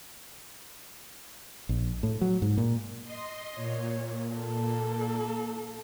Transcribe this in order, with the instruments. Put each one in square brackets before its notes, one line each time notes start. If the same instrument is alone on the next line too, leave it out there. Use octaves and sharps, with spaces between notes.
[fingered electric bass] A#1
A2
F#3
G#2
A#2
[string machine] D#5 C6
[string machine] A#2 [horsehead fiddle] C#5
[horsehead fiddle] A#3 A4